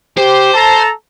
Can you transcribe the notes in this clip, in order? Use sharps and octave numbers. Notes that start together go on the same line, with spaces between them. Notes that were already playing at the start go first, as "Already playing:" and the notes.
G4 C5
A4 A5 A#5